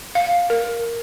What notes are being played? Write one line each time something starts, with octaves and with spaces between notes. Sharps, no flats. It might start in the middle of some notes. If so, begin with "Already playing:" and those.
F5
A#4